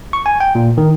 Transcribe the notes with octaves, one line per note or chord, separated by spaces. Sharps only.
C#6
G#5
G5
A#2
D#3